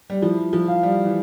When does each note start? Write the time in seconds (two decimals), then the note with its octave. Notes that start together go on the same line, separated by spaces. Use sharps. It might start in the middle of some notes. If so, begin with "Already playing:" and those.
0.10 G3
0.22 F3 E4
0.53 F3
0.68 F5
0.83 G3
1.05 E3